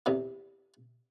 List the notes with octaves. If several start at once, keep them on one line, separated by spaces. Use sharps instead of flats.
E2 C3 E3